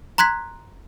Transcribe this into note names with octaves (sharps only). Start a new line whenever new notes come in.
A#5 C6 F#6 G#6 B6